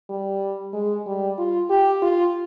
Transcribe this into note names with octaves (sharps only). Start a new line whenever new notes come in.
G3
G#3
G3
F4
G4
F4